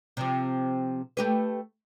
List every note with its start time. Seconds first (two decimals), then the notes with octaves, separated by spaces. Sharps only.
0.17 C3 F3
1.17 A3 G4 B4